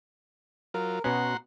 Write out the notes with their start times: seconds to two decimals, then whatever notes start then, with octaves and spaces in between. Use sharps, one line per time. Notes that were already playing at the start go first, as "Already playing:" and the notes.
0.74 F#3 F4 A#4
1.04 B2 B3 C#4 F#4 F#5 A#5 C6